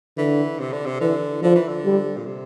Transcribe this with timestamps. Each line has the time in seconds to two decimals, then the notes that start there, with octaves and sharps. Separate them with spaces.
0.17 D3 E3
0.59 C3
0.73 D3
0.86 C3
1.01 D3 E3
1.43 D3 F3
1.55 E3
1.68 D3
1.85 G3
2.17 A#2
2.26 C3